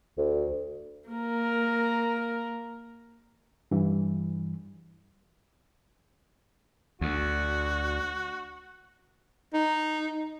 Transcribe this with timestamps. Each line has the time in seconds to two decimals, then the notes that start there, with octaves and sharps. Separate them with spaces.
0.17 D2
1.09 A#3 A#4
3.71 G2 E3
7.01 D2 F#4
9.53 D#4